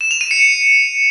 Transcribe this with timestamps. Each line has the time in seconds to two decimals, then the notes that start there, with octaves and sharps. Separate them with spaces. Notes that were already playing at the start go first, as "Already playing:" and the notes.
0.01 E7
0.11 F7
0.21 D#7
0.31 C#7